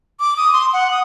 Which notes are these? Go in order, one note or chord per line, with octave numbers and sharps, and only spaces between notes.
D6
D#6
C6
F#5
D#6